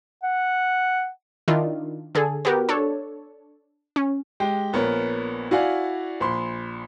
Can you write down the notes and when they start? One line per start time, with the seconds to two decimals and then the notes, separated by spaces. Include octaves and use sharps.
0.23 F#5
1.48 D#3 D4 E4 F4
2.15 D3 G#4 A4
2.45 B3 F#4 G4 A#4
2.69 D4 A4 C#5
3.96 C#4
4.40 G#3 G4 G5
4.73 A#1 B3 A#4 C#5
5.51 E4 F#4 D5 F5 F#5 G#5
6.20 A#1 B5 C6